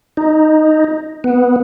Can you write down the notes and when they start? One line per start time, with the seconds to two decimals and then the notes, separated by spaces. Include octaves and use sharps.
0.17 D#4
1.24 B3